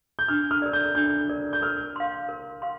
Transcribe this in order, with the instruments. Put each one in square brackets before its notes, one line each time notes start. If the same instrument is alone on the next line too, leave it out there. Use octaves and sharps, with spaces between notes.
[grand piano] G6
[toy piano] D4 [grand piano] F6
[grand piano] F6
[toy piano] A#4 D5
[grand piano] G6
[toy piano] D4 [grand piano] G6
[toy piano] A#4 D5
[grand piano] G6
[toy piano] A#4 [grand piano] F6
[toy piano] F5 C6
A#4
F5 C6